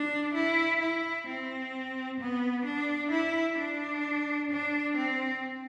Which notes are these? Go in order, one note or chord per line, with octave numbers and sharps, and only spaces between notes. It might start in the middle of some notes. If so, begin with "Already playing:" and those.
Already playing: D4
E4
E4
C4
B3
D4
E4
D4
D4
C4